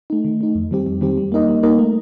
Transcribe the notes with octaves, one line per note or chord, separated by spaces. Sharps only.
A3 D#4
D#3
A3 D#4
F2
D#3 G3 C4 G4
F2
D#3 G3 C4 G4
G3
A#3 D#4 A#4 D#5
G3
A#3 D#4 A#4 D#5
A3